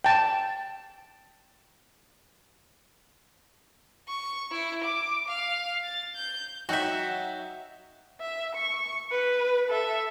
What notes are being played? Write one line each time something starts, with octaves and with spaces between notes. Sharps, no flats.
G5 A5
C#6
E4
D6
F5
A6
G6
F#3 D#4 F#4 E5 G5 G6
E5
C#6
B4
A4 E5